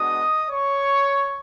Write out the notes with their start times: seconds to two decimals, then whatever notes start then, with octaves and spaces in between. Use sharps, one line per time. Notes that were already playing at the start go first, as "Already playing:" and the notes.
Already playing: G#3 B3 D4 F#4 D#5 D#6
0.50 C#5 C#6